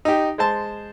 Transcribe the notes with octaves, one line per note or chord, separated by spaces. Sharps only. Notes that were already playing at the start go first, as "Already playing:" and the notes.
D#4 G4
G#3 C5 A5